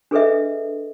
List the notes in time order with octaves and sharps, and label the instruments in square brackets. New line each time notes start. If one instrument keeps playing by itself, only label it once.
[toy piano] D4 G#4 A4 B4 D#5 E5